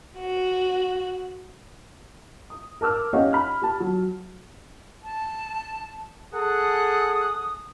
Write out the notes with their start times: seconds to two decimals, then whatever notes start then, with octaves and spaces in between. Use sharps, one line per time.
0.18 F#4
2.50 D#6
2.81 A#4 A5 D6 E6 F6
3.13 C#4 D#4 G4 C#5 F5 F#5
3.33 B5 F6
3.62 G4 A5
3.80 F#3
5.03 A5
6.33 G#4 A4 F#5 D#6